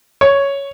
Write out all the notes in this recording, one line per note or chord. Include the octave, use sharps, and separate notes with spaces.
C#5